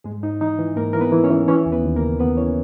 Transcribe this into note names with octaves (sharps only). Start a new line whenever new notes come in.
G#2 G#3 G#4
G#2 D#4
E3 D#4
E3
G#2 A#3 A#4
E3 A#4
B3 B4
E3
C#4 C#5
E3
E3 C#4 C#5
D#2
B3 B4
D#2
A#3 A#4
C#3
D#2 B3 B4
E3 C#4 C#5